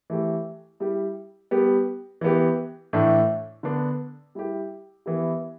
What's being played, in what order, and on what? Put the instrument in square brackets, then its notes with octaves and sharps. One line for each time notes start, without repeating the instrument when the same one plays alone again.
[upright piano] E3 A3 G4
G3 E4 G4
G3 B3 G4
E3 B3 G4
A2 E3 A3 D4
D3 B3 D4
G3 E4 G4
E3 B3 E4 G4